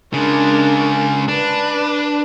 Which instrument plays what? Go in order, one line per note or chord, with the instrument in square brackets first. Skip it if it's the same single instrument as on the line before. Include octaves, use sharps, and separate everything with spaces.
[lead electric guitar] C#3 G#3 [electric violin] D4 A#4
[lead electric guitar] D4 [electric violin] B4